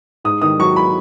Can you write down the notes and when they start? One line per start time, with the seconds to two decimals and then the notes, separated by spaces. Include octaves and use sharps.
0.24 G#2 D#6
0.42 D#3 D#6
0.59 F#3 C#6
0.76 B5